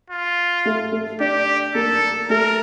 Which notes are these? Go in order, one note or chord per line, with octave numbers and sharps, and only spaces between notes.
F4
A3 A4
A3 A4
D4 G4 D5
A#3 A4 A#4
A3 A4 A#4